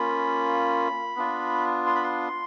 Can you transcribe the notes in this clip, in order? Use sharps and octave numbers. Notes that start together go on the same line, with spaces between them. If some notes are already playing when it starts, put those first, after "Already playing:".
Already playing: A#3 C#4 F4 B5
B3 D4 F4
C6
B5
C6